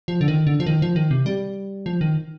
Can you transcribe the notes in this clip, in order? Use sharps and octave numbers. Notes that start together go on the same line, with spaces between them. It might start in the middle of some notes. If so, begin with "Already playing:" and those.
F3
D3
D#3
D3
F3
D#3
F3
D#3
C3
G3
F3
D#3